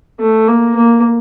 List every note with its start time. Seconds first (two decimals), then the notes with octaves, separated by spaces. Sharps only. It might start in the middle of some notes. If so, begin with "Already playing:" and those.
0.20 A3
0.47 A#3
0.76 A#3